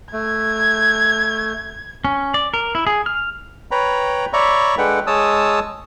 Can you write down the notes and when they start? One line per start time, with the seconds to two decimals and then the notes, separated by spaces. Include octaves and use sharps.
0.13 A3 G#6
2.05 C#4
2.34 D5
2.54 A#4
2.75 E4
2.87 G#4
3.06 F6
3.71 B4 C#5 G5 A#5 B5
4.33 C#5 D5 E5 A#5 B5 C#6
4.78 G#3 D4 A4 B4 F#5 G5
5.07 G#3 C#5 A5 D#6 E6